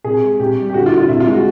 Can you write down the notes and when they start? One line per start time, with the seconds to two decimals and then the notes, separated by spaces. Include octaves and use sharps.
0.04 C3 G#4
0.23 G#3
0.40 C3 G4
0.58 G3
0.70 G4
0.74 D3 F#4
0.86 F4
0.92 D3
0.97 F4
1.09 C3 E4
1.20 F4
1.27 G#3
1.33 F#4